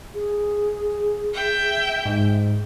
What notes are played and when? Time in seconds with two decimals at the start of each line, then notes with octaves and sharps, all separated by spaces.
0.14 G#4
1.33 E5 G5
2.05 G#2